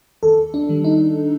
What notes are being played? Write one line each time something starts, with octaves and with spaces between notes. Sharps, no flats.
D#2 A4
D4
D#3 G3
D#4